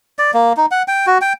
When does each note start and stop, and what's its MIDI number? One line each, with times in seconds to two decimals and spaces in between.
0.19 0.31 74
0.34 0.53 58
0.57 0.66 63
0.71 0.83 78
0.88 1.06 79
1.07 1.18 66
1.21 1.33 79